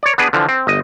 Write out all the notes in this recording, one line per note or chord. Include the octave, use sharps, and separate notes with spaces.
C#5 D5
B3 D4 G#4 B4
D3 E3 F3
C4
G1 D#5